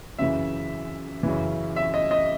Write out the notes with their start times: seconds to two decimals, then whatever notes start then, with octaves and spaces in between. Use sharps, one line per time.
0.19 F#2 C#3 E3 E5
1.23 F#2 C#3 E3
1.76 E5
1.94 D#5
2.11 D#5